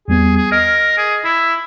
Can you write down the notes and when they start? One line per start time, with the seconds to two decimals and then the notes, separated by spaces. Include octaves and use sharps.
0.08 E2 G3 B3 G#4
0.37 G#4
0.52 A#4 D#5 F6
0.98 G#4
1.25 E4